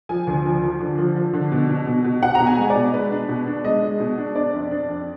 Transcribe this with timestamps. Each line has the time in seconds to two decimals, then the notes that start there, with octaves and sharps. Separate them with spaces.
0.09 F3 G#5
0.27 D2
0.45 F3
0.63 F3
0.80 D3
0.98 F3
1.16 F3
1.33 D3
1.51 B2
1.69 B2
1.87 B2
2.04 B2
2.23 B2 F#5
2.35 A#5
2.40 B2
2.47 G#5
2.58 G#3
2.70 D5
2.76 B2
2.94 G#3 B4
3.11 D4
3.29 B2
3.47 D4
3.64 G#3 D#5
3.82 G#3
4.00 B2
4.18 D4
4.35 D4 D5
4.53 F2
4.71 D4
4.89 F2